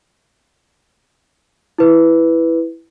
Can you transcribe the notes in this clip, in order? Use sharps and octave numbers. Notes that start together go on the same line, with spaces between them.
E4 B4